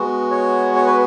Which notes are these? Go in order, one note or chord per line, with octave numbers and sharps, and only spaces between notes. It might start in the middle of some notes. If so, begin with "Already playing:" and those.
Already playing: G#3 B3 F#4
C#5
C#5
B4